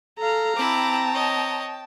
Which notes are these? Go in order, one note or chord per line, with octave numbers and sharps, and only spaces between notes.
A4 F5 A#5
C4 E4 G5 A5 D6
C#5 D#5